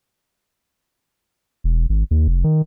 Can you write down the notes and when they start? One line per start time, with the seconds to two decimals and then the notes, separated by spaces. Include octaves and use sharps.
1.64 E1
1.89 G#1
2.11 D#2
2.28 F1
2.44 D#3